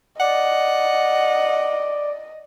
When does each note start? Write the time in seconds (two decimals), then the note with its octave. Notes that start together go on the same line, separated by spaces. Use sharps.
0.20 D5 D#5 F#5